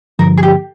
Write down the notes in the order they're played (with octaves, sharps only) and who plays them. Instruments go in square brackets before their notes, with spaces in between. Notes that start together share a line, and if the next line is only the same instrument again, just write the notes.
[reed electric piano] G2 D3 F3 [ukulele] A#4
[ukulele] G#4
G4